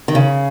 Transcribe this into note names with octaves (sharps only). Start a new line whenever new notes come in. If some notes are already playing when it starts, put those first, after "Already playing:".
D#3
C#3